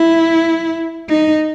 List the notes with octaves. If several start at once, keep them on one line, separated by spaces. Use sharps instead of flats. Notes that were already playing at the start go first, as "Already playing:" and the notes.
Already playing: E4
D#4